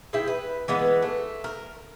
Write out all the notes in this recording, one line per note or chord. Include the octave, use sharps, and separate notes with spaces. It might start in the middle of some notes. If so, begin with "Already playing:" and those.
G#3 E4 G5
B4
E3 G#3 B3
A3
A#4